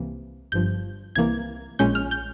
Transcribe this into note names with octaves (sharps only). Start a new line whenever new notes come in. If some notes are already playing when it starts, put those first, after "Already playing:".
Already playing: C2 C3 E3 A#3
G1 G2 F3 G6
C2 C3 E3 A#3 G#6
A#1 A#2 G#3 C#4 G6
F6
G6